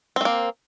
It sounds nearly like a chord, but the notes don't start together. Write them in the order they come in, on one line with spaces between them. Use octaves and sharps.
C4 A3 A#3